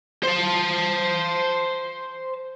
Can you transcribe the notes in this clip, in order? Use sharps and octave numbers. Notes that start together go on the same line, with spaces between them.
C5 A5